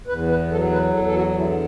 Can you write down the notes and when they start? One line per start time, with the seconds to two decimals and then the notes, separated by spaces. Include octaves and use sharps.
0.07 E2 B4
0.29 B4
0.51 F#3 A4
0.72 B4
0.93 E2 A4
1.05 A4
1.16 F#4
1.37 D3 E4